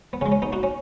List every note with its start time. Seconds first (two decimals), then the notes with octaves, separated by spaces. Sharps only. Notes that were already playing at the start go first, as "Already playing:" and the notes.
0.13 B3
0.21 C#3 G#3 C#4
0.32 C#4
0.42 B3 D#4
0.53 D#4 F#4
0.63 C#4